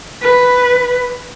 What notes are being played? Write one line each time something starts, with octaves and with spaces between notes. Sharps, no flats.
B4